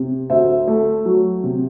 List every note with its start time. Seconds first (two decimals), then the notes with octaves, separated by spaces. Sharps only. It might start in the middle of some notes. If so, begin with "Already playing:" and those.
Already playing: C3
0.30 D2 C5 E5
0.67 A3
1.06 F#3
1.44 C3